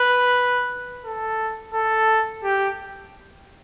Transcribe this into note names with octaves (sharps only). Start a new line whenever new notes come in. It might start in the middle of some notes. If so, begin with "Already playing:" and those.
Already playing: B4
A4
A4
G4